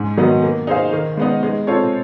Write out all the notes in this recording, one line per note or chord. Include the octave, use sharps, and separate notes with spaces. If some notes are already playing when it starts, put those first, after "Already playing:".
Already playing: G#2
D#3 F#3 B3 D#4
A#3
D#4 G#4 C5 F5
D#3
G#3 B3 D#4
G#3
C4 F4 A4 C#5